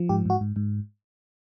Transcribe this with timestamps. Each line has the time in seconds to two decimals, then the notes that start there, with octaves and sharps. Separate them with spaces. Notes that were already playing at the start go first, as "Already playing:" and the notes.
Already playing: F3
0.09 G#2 G4
0.26 G#2 F#4
0.41 G#2
0.56 G#2